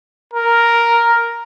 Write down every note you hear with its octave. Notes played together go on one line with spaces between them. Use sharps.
A#4